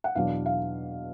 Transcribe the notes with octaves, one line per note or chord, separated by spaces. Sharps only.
F#5
E2 B2 F#3 B3 D4 F5
F5